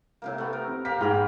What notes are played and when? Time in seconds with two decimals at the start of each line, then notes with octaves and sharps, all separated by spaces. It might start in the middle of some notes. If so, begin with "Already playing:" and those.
0.22 A2 C3 A#3
0.38 A3 B3
0.53 A#4
0.68 C4
0.85 A#3 G4 A#4 B6
1.01 G#2 G#4 G5 B5 F6